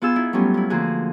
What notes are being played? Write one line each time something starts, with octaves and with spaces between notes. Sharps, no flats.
B3 F4 G#4 E6
D#4 E4
F#3 G3 A3 B3 C#4 F4
C#4 E4
D3 F3 A3 A#3 F#4 G#4